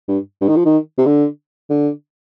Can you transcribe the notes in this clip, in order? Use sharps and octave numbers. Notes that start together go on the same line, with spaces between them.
G2
G2
D#3
F3
D#3
C3
D3
D3